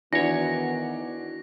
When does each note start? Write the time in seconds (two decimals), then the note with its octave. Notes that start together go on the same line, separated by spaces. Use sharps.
0.13 E2 D#3 E3 B3 D4 F#4 C#5 A#6